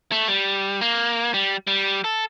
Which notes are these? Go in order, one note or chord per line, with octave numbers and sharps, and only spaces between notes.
A3
G3
A#3
G3
G3
A4